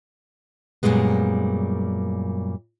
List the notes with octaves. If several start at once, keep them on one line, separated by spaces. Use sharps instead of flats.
F#2 A#2 G3 G#3 B3